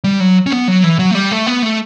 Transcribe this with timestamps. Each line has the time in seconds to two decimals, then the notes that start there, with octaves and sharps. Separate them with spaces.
0.04 G3
0.20 F#3
0.46 C#4
0.52 B3
0.68 F#3
0.84 E3
0.99 F#3
1.11 A3
1.15 G3
1.31 A3
1.47 B3
1.63 A3